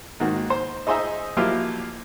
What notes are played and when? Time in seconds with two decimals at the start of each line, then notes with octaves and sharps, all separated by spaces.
0.20 G#2 D#3 A#3 F#4
0.50 C5
0.87 D#4 G#4 C5 D#5 E5 A#5
1.37 F3 F#3 A#3 E4 F4 G4